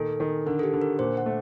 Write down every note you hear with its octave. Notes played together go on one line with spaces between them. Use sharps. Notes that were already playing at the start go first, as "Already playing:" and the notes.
Already playing: A#2 D#3 A4
D#3
D3 A#4
A4
G4
D3
A#4
A#2 C5
F#5
A3